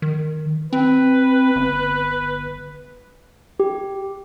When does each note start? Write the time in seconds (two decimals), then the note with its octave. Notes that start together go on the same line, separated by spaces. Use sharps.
0.02 D#3
0.73 C4 B4
1.56 G1
3.60 G4